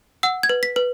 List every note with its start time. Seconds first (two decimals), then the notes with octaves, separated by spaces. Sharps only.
0.23 F#5 E6
0.43 G#6
0.49 B4
0.63 B6
0.76 B4